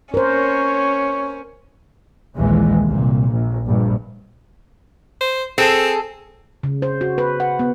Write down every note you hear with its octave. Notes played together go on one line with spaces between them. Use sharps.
C#4 A#4 C5 C#5
A#1 D#2 A#2 E3 G#3
C2 A#2
A#1
A#1 G2
C5
C4 G#4 A4
C#3
C5
F#4
B4
F#5
B3